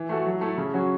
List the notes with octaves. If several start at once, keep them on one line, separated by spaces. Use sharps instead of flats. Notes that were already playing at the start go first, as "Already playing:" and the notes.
Already playing: E3
A3 F#4 A4
F#3
A3 E4 A4
C#3
F#3 C#4 F#4